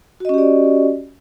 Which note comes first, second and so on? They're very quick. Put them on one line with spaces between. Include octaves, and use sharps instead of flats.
F#4 D#5 C#4 G4 D5